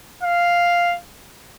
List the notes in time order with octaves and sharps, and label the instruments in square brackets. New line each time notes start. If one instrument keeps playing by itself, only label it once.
[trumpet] F5